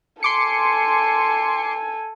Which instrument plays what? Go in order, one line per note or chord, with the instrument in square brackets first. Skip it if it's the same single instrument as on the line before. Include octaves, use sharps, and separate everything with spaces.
[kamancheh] A4 G#5 [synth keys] C6 D6 C#7